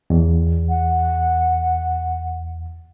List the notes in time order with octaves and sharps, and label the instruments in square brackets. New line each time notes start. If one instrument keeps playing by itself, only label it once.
[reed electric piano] E2
[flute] F#5